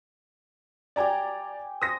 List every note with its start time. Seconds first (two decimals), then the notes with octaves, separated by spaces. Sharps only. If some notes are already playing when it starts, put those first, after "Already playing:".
0.96 G4 D5 G5 G#5 A#5 G#6
1.82 C5 D#6 A#6